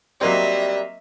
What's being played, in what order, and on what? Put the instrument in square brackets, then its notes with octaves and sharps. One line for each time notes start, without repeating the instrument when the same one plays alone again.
[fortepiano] F#3 A#3 C4 [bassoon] G3 [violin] D#5 E5